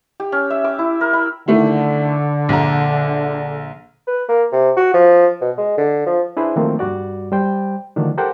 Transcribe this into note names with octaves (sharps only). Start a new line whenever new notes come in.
G4
C#4
E5
D6
E4
A#4
B5
D3 D#3 A3 E4
A#1 A#5
B4
A#3
C3
F#4
F3
B2
G#3
D3
F3
D4 E4 G#4 B4 C5
D#3 F3 F#3 A3 A#3 C4
G2 G3 F#4 D5
G3 C5 G5
D3 D#3 F3 F#3 A3 D4
G4 A4 A#4 C5 F#5 G5